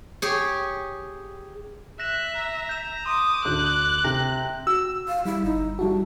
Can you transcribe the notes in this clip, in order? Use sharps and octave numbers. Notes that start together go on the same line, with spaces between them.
G4 G#4 C#5
E5 F#6 A#6 E7
A#5
G6 E7
C6 D6 D#6
D2 F#6 G6
C3 A#6
F#4 E6
F5
G3 E4
G1 D#4
G3 E4 F#4 A5